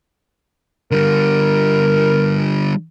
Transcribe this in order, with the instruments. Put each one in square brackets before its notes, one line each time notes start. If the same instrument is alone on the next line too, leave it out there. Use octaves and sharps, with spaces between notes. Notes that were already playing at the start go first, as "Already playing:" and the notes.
[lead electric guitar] D3 G3 [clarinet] A#4